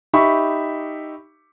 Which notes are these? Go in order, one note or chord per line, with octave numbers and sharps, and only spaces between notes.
D#4 G4 E5 B5 C#6